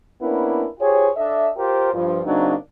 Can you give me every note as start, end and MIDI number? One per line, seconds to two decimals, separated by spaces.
0.22 0.65 58
0.22 0.65 59
0.22 0.65 61
0.22 0.65 62
0.22 0.65 64
0.22 0.65 70
0.80 1.08 65
0.80 1.08 67
0.80 1.08 68
0.80 1.08 72
0.80 1.08 73
1.16 1.48 62
1.16 1.48 69
1.16 1.48 75
1.16 1.48 76
1.57 1.91 65
1.57 1.91 67
1.57 1.91 70
1.57 1.91 72
1.93 2.20 43
1.93 2.20 53
2.26 2.54 49
2.26 2.54 54
2.26 2.54 58
2.26 2.54 60
2.26 2.54 62
2.26 2.54 63